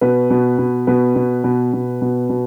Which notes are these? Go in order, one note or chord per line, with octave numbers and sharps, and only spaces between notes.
B2 B4
B2
B2
B2 B4
B2
B2
B2
B2
B2